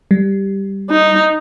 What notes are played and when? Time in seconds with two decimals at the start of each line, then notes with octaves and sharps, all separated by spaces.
0.11 G3
0.91 D#4